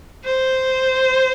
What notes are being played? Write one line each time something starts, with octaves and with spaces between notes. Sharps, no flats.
C5